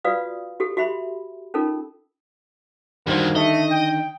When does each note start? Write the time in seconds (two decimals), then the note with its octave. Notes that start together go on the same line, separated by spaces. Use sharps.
0.04 F4 F#4 B4 D5 F5 D#6
0.60 F#4 G4 A4
0.77 F#4 G4 E5 B5 C6
1.54 C#4 D#4 F4 A4 A#4
3.07 F#2 D3 D#3 G3 G#3 A#3 F#4 C5
3.36 A3 D#4 D#5
3.71 G5